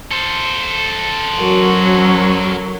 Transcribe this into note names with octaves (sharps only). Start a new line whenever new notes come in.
A4 C5
F#3 C#4 F#4 A#4